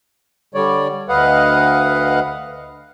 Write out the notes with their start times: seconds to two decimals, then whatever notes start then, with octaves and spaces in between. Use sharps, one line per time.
0.55 D3 G3 C#5 D5
1.09 D2 B4 D#5 F5 F#5